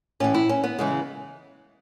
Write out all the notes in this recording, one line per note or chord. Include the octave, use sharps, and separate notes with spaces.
A2 E3 C#4
E4
C#4
B3
C#3 E3 G#3